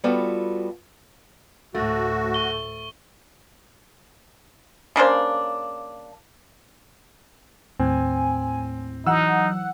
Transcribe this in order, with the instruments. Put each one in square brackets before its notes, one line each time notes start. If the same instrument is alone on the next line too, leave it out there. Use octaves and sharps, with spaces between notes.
[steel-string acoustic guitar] G3 B3 F4 F#4 A4
[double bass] D2 A2 [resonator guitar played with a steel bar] A3 [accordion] F#4
[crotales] C#6 G7
[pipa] C#3 A#3 D4 C5
[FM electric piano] D#2 A2 [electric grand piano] C4 [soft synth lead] G#5
[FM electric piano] E3 F#5 F#6 [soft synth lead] F#3 [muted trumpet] D#4 [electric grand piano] E6